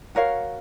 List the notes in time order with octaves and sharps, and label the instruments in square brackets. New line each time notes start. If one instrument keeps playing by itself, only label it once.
[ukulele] F#4 A#4 C#5 F5